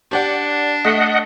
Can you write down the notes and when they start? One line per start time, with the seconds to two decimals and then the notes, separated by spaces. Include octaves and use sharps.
0.11 D4 G4 D5 F#5
0.85 A3 D#5 F#5 B6